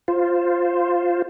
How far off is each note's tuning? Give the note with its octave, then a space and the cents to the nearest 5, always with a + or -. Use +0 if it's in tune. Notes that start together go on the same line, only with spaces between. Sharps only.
F4 +0 C5 +0